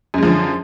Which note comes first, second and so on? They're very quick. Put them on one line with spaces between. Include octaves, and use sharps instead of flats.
F#2 G#3 F3 D3